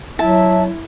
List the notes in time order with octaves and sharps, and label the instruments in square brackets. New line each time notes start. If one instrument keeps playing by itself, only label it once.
[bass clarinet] F#3 [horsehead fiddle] E4 [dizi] E5 [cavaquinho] A5